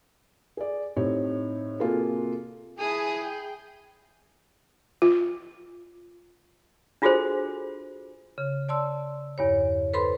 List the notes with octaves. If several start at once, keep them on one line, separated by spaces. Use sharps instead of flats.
G#4 D5
A2 C4 D#4 G4 C#5
C3 A#3 F4 F#4 G#4 A4
E4 G#4 G#5 A5 D#6
G5
F4
D4 F4 F#4 G#4 A4 C5
C#3
D5 A5 C6 E6
E2 G2 C#5
A4 B4 C5 B5 C6